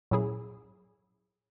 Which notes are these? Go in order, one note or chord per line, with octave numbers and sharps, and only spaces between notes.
A#2 F#3 C#4 E4 G#4